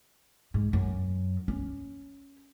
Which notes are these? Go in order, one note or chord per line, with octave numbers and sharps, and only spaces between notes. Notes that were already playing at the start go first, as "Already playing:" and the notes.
G#2
F#2
C#4